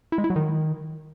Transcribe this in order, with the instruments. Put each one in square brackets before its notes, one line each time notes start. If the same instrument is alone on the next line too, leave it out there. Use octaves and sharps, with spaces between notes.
[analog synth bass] E4
G#3
E4
F#3
D#3